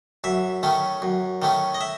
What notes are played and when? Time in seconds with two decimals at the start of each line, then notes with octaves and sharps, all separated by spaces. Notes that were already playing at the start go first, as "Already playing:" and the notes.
0.24 F#2 E5
0.63 D#3 A3 C#4
1.02 F#2
1.42 D#3 A3 C#4
1.74 D#5
1.81 E5